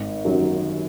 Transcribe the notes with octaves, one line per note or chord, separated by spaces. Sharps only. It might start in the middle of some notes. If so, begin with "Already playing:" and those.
Already playing: G#1
F#2 D#3 F#3